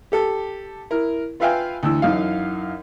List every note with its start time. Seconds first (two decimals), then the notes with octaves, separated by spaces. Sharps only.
0.12 G4 A4
0.90 E4 A#4
1.40 F4 B4 E5 F5 G5 G#5
1.83 D2 E3 E6
2.02 F#2 E3 D#4 F5